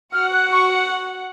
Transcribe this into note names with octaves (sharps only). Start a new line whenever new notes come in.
F#4 F#5 F6
F#6
C#6